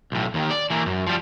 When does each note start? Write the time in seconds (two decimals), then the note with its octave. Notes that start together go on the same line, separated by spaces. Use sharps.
0.12 B1 A2
0.34 D#2 D#3
0.50 D5
0.70 E3 A#3
0.86 F#2
1.07 F3 G3